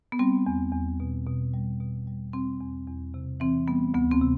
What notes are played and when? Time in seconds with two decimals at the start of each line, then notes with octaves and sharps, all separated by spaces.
0.12 B3
0.19 G3 C4
0.47 E2
0.72 E2
1.00 B2
1.27 B2
1.53 G3
1.80 B2
2.07 G3
2.33 G3 C4
2.61 E2
2.87 E2
3.14 C3
3.40 E3 C4
3.67 G3 B3
3.94 D2 B3
4.11 C4
4.21 C3